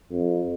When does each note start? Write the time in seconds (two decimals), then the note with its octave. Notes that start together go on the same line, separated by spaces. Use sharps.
0.11 F2